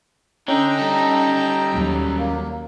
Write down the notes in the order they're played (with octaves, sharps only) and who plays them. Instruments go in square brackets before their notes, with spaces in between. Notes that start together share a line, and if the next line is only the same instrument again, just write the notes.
[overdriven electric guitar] D3 [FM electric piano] C#4 [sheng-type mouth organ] D#4 G5 A#5
[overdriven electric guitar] G3 A4
[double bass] D#2 F#3
[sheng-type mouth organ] A#3